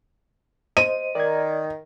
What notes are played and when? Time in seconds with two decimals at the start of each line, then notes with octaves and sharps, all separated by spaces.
0.77 C5 D#5 D#7
1.15 D#3 D5 G#6